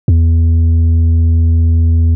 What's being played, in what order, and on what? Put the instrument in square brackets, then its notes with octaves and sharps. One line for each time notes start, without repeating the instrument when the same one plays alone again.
[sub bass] E2